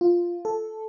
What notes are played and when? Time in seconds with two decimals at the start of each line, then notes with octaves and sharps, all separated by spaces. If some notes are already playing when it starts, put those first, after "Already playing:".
0.01 F4
0.45 A4